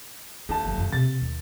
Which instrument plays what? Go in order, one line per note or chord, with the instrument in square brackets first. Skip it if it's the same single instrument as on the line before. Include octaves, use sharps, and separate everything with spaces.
[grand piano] D#1 A5 [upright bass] D4
[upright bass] G1 F#2
F#2 F4
[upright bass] C3 [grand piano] A6
[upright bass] D#2